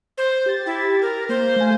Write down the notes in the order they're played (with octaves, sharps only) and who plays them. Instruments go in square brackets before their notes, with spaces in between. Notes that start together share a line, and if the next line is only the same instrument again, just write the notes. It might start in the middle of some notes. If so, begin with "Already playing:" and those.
[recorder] C5
[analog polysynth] G4 A6
[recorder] E4
A#4
[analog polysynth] A#3 [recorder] C5
[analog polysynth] A3 F5 G#5